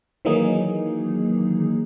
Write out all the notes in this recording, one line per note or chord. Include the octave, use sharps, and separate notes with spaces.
D#3 E3 F#3 A#3 D#4 G#4